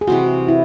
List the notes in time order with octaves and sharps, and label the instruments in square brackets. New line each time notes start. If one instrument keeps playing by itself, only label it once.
[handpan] G#4
[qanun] C3 E3 G#3 C4 [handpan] F#4
[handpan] E4